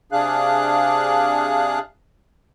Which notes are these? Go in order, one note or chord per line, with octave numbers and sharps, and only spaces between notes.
C3 D4 G#4 F5 F#6